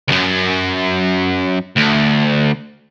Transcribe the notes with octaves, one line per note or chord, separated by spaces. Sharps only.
C#2 F#2
D2